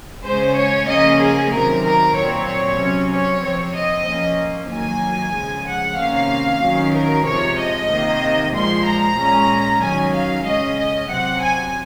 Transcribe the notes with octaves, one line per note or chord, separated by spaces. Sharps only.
C#3 G#3 C#4 C5
C#5
C#3 F3 A#3 C#4 D#5
G#4
C3 D#3 F#3 A#4
A#4
A#2 F#3 C4 C#5
C3 F#3 C#4
C#5
C3 F3 C4 C#5
D#5
F3 A#3 C#4
D#3 F#3 A#3 G#5
C#3 F3 G#3
F#5
C3 D#3 A#3 C#4 F5
D#3 F#3 C#4
A#4
C3 F3 G#3 C#5
D#5
C3 D#3 A#3
A#2 F3 G#3 C6
A#5
A#2 G#3 C#4
D#3 F#3 C#4 G#5
F5
C#3 G#3 C#4 D#5
D#5
C3 F#3 C4 F#5
G#5